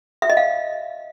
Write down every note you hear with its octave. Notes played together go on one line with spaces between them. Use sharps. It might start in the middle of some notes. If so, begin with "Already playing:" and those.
E5
D#5
F5